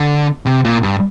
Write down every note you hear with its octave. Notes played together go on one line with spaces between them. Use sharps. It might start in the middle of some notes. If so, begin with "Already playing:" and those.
Already playing: D3
C3
A#2
G2